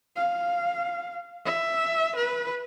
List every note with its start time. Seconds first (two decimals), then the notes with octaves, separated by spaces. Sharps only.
0.17 F5
1.46 E5
2.16 B4